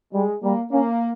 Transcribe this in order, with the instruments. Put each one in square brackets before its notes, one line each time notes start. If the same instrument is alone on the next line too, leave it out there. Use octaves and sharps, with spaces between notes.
[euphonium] G3 [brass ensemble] G#3
[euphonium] G3 [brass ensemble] A#3
[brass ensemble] A#3 [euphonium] C#4